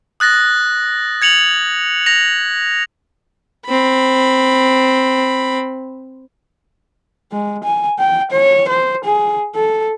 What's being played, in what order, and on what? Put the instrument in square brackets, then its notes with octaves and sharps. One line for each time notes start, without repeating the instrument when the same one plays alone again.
[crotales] D#6 F#6 A6 A#6
G#6 C#7 F7 F#7
A#6 F7
[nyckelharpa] C4 B5
[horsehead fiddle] G#3
G#5
G5
C#5
C5
G#4
A4